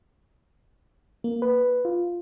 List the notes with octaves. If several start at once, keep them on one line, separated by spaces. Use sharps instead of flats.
A#3
B4
F4